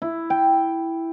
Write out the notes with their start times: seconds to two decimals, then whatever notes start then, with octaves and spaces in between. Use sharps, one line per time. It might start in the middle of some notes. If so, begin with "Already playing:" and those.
0.02 E4
0.30 G5